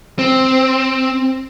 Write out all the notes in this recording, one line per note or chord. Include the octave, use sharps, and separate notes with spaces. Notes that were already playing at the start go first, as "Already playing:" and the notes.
C4